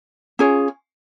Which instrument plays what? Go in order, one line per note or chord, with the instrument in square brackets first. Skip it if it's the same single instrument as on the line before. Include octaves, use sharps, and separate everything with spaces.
[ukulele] C#4 F4 G#4 C#5